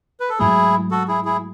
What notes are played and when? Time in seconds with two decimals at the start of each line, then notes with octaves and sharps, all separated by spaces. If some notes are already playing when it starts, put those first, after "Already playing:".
0.20 B4
0.29 A4
0.39 G#2 F#3 A3 E4 G#4
0.91 F#4 A4
1.08 E4 G#4
1.25 E4 G#4